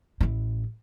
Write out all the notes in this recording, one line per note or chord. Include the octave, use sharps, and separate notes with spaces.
A1 E4